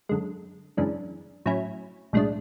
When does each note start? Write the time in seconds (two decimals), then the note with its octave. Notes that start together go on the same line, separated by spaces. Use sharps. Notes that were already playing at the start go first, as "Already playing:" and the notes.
0.09 F#2 D3 G#3
0.77 F#2 C#3 E3 G#3 D4
1.46 A2 F#3 C#4 E4
2.13 B1 A2 G#3 D4